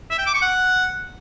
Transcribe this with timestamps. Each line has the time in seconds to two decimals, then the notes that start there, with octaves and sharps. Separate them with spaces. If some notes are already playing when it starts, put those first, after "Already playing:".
0.10 E5
0.18 G5
0.26 D6
0.34 C#6
0.41 F#5